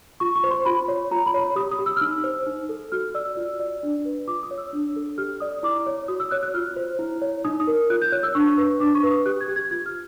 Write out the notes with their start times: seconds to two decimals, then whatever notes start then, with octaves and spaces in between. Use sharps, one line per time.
0.20 F4 C#6
0.35 C#6
0.44 C5
0.51 C6
0.66 F4 B5
0.88 C#5
1.11 F4 A#5
1.26 B5
1.34 C#5
1.41 B5
1.56 G4 D#6
1.71 D#6
1.79 G4
1.86 E6
1.97 F6
2.01 D#4 E6
2.24 C5
2.47 D#4
2.69 A4
2.92 F#4 F6
3.15 D5 E6
3.37 F4
3.60 D5
3.83 D4
4.05 B4
4.28 F4 D6
4.43 D#6
4.51 C#5
4.58 E6
4.73 D4
4.96 A4
5.18 G4 F6
5.40 D5 D#6
5.63 E4 D6
5.86 C#5
6.08 F#4 D#6
6.20 E6
6.31 C#5 F#6
6.43 F#6
6.54 F4 F6
6.76 C5
6.99 E4
7.22 C#5
7.45 D#4 D#6
7.60 D#6
7.67 A#4
7.90 F4 F#6
8.02 G6
8.12 C#5 F#6
8.23 E6
8.35 D4 C#6
8.58 B4
8.80 D4 D6
8.95 C#6
9.03 B4
9.11 D#6
9.26 G4 F#6
9.41 G#6
9.48 G4
9.56 G#6
9.71 F4 G#6
9.86 F6